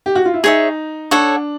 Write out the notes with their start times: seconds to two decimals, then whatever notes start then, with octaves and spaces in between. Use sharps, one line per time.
0.06 G4
0.15 F#4
0.25 F4
0.34 E4
0.43 D#4 G#4 C#5 E5
1.11 D4 A4 C#5 F#5